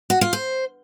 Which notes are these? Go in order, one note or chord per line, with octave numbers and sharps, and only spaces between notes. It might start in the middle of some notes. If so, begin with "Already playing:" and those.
F#4
F4
C5